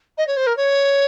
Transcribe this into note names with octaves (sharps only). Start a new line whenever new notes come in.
D#5
C#5
C5
A#4
C#5